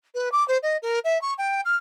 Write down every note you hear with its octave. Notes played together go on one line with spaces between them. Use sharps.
B4
D6
C5
D#5
A#4
E5
C#6
G5
F6